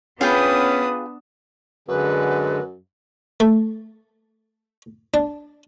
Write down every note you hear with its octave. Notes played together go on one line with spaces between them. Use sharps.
B3 C#4 D4 F4 G#4 B4 G5 D#6
F#2 D3 G#3 B4
A3
D4